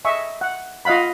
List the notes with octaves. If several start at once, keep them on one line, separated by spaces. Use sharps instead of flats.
D#5 E5 G#5 C#6
F#5
F4 D#5 F5 F#5 B5